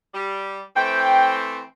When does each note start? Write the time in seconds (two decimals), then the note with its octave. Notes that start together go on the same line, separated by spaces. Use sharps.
0.14 G3
0.76 E3 A3 C4 G5